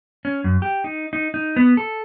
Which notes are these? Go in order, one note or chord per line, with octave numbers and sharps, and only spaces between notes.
C#4
F#2
G4
D#4
D#4
D#4
B3
A4